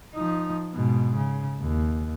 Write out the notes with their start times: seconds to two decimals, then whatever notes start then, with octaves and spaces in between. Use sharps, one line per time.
0.14 F3 D#4
0.73 G#2 B2
1.16 C#3
1.60 D#2